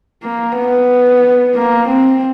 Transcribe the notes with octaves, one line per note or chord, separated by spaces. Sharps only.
A#3
B3
A#3
C4